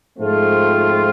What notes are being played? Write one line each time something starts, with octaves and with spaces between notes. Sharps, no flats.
G#2 F3 A3 C4 F4